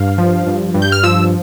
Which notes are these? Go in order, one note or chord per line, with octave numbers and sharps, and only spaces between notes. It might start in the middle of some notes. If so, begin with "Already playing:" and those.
Already playing: G2 F5
F3
G2
G2
G6
F6
F3 E6